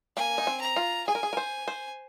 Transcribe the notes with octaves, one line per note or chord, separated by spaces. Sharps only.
A#3 G#5
D#4
C4
A#5
F4
G#4 G#5
A#4
G#4
A#4
C5
C5